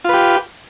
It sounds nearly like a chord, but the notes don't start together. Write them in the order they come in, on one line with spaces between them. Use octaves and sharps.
F4 B4 G4